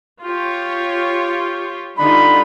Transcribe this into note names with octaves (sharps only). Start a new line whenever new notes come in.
F4 G4 C#5
D3 G3 D4 D#4 F4 B5